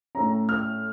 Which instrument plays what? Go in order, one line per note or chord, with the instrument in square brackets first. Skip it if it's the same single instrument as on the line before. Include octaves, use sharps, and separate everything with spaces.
[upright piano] A2 A3 C#4 A#5
F6